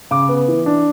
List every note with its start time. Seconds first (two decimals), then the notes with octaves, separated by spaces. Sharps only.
0.11 C#3 D6
0.29 B3
0.48 E3
0.66 D4